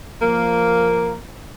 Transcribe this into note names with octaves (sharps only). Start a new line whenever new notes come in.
F3 A#3